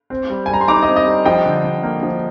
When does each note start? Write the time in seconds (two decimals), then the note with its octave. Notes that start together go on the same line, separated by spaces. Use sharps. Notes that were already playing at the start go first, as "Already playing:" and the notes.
0.10 C4
0.30 G3
0.46 G#5
0.49 G3 A#5
0.61 C6
0.68 D#4 A#5 D6
0.82 D#5
0.88 C4
0.96 D#5
1.06 G3
1.25 F3 D#5 G5
1.45 D3
1.64 D3
1.83 A#3
2.03 F3